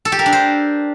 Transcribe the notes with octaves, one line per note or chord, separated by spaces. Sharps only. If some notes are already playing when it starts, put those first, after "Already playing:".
A4
G4
A#4
D4
C5